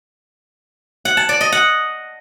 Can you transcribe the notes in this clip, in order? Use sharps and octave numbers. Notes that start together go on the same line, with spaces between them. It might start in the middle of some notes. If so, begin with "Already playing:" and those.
F#5
A5
D5
D#5
F#5